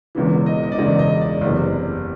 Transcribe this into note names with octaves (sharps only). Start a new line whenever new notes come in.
E1 E2 C#3 E3
D#5
D#5
D5
E1 E2 C#3 E3 D#5
D#5
D5
F#1 E2 C3